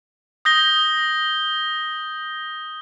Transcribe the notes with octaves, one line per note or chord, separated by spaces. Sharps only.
D#6 G6 A#6 G7